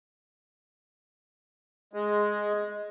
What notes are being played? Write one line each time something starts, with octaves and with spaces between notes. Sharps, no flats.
G#3